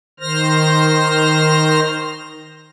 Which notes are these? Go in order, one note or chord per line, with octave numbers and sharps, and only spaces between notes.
D#3 C5 F6 A#6